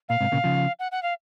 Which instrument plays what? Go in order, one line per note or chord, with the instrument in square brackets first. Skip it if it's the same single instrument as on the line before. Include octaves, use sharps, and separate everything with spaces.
[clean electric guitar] A#2 [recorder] F5
[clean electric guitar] G#2 C3
A#2 C#3
C#3 F3
[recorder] F#5
F#5
F5